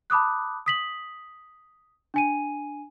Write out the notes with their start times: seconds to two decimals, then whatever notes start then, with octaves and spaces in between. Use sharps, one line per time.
0.10 A5 B5 D6 D#6 F#6
0.66 D#6 B6 F#7
2.14 D4 G#5 D#7